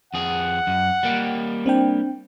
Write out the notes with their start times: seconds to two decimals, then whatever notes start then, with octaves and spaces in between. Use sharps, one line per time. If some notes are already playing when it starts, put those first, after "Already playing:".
0.14 F2 G#4 F#5
0.67 F#2
1.03 G3 A#3 G4
1.66 C4 D4 G5